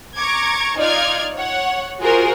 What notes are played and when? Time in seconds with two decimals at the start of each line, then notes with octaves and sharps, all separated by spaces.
0.15 A#5 C#6 D6 G#6
0.77 D#4 F4 D5 F6 G#6
1.34 C#5 F#5
2.01 F4 F#4 G#4 A#4 C5